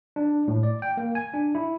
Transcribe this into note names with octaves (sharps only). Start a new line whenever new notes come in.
D4
A2
D5
G5
A#3
G#5
D4
E4